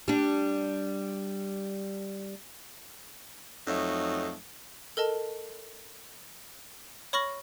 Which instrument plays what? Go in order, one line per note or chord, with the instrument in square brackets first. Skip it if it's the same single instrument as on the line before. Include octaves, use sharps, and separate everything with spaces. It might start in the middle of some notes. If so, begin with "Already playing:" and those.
[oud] G3 D4
[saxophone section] F2 F#3 A3 D#4
[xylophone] A4 A#4 D#5 A5
C#5 B5 C#6 F6 A#6 F#7